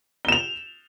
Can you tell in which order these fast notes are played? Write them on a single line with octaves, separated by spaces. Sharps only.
G7 E7 F7